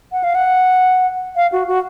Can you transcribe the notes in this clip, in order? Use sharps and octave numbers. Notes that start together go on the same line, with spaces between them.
F#5
F5
F#5
F5
F#4
F#4